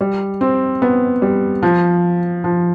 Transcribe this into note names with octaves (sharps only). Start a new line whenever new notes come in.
G3
C4
B3
G3
F3
F3